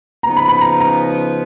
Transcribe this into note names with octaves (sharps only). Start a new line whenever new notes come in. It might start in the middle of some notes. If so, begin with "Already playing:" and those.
C#3 F3 B3 D#4 A#5
B5
B5
A#5
A#5